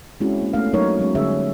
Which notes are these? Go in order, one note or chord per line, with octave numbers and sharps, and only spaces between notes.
G#3 C4 C#4 E4 F#4
A#3
A3 B3 C#4 F5
F#3 A3 A#3 D#4 A#4 C#5
F#3 G#3 C#4
D3 G3 C#4 G#4 C#5 E5